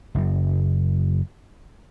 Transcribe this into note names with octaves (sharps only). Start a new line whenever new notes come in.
F#1 F#2